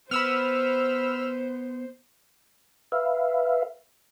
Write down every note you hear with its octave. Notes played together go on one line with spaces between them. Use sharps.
B3 C5 B5 E6 F6
B4 E5 F5